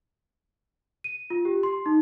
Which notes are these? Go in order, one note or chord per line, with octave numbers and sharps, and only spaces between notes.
D#7
F4
G4
C6
D#4